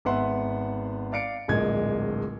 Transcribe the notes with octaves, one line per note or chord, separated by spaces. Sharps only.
G#1 B3 B4 E5 F#5 C6
D5 F5 C#7 D7
D1 A#1 G#3 A#3 G#6